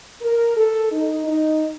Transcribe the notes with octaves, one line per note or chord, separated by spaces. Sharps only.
A#4
A4
D#4
D#4